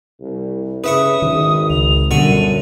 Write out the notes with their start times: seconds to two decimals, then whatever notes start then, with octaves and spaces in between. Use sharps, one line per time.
0.21 C2
0.84 C#3 B4 E5 C#6 D#6
1.22 G#1 D#3
1.70 C#2 F7
2.11 F#2 B2 D3 G3 C#6 D#7